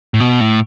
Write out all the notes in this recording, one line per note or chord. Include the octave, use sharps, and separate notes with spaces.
A2
B2
A2